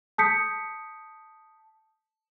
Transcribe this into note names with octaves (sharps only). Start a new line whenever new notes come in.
A5 D#6 G6 B6 C#7